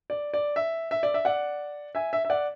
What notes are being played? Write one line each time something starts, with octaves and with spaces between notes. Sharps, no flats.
D5
D5
E5
E5
D5
E5
D5 F#5
E5 G#5
E5
E5
D5 F#5